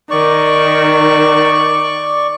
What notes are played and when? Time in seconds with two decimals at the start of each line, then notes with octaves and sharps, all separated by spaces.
0.11 D#3 D5 C#6